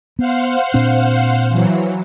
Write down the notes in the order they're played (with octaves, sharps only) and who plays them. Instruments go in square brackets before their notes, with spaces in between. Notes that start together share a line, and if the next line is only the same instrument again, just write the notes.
[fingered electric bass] B3 [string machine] C5 F5 F#5
[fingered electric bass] A#2 C4 D4
[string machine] E3 F#3